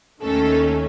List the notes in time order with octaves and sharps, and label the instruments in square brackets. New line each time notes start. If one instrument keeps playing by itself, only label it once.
[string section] D#2 D#3 A3 C#4 A4